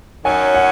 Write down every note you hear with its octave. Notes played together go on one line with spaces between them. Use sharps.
F#2 D#3 F#3 C#4 G#5
F#5